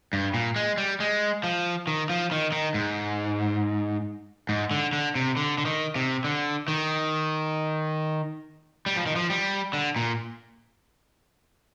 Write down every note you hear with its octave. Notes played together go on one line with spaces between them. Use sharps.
G2
A#2
G#3
G3
G#3
F3
D#3
F3
D#3
D#3
G#2
G#2
D3
D3
C3
D3
D3
D#3
C3
D3
D#3
G3
F3
D#3
F3
G3
D3
A#2